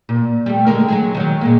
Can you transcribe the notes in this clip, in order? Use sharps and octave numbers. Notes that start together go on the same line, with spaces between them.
A#2
G3 A3
D3 G#3 A#4
F#3 G#3 G#4
D#3 F#3
A#2 G#3 A#3